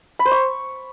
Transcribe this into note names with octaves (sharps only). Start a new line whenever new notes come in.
B5
C5
C#6